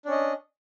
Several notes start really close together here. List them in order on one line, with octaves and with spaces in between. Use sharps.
D4 C#4 D#5